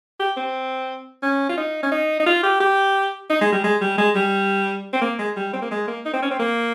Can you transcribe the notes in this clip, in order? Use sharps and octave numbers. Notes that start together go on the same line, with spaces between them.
G4
C4
C#4
F4
D#4
C#4
D#4
D#4
F4
G4
G4
D#4
G#3
G3
G#3
G3
G#3
G3
C4
A#3
G#3
G3
C4
A#3
G#3
A#3
D#4
C4
C#4
C4
A#3